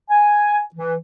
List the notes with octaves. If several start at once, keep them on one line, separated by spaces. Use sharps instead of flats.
G#5
E3